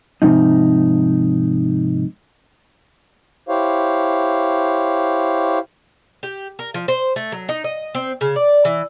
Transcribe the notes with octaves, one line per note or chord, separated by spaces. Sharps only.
G#2 C3 F3 D#4
E4 G4 C5 C#5 F5
G4
A#4
F3
C5
A3
F#3
D#4
D#5
C4
C#3
D5
E3